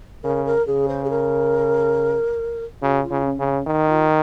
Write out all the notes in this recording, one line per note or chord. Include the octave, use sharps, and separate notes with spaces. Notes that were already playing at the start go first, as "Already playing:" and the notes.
C#3 A#4
A#4
C#3 G#4
C5
G#4
A#4
C#3 F#4
F4
C#3
C#4
C#3
C#4
D#3 D#4
F4